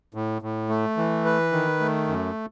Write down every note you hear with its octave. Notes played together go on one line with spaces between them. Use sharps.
A2
A2
A3
E3
B4
D#3
A3
F#2